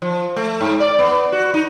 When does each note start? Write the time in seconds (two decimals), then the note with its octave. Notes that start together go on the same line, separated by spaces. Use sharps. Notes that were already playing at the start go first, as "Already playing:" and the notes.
0.02 F3
0.36 A3
0.61 G#2
0.80 D5
0.99 B3
1.32 F#4
1.54 D#4